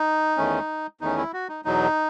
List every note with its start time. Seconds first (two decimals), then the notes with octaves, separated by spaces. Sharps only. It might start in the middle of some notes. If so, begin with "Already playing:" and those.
Already playing: D#4
0.37 E2 D#3 A3 C#4
1.01 E2 D#3 A3 C#4 D#4
1.17 E4
1.33 F#4
1.49 D#4
1.65 E2 B2 F#3 D#4